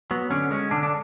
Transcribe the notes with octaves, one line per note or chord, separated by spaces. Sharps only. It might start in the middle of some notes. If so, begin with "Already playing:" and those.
F#3 B3
D3 C#4
G#3 C#4
D3 D4
D4